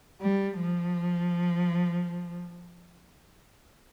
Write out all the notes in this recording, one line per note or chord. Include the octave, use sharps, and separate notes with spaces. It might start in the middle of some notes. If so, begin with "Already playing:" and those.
G3
F3